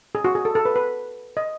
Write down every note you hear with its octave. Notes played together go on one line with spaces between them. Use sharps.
G#4
F#4
G#4
A4
A4
B4
B4
D#5